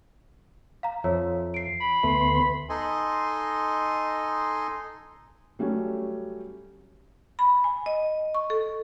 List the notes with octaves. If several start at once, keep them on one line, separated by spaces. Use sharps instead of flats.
F5 A#5
F2 F3 C#5 E5
C7 D7
B5
D2 A3 B3 C6
D#4 A4 D#5 G#5 C6
F#3 G3 A3 C#4
B5
G#5
D#5
C#6
A4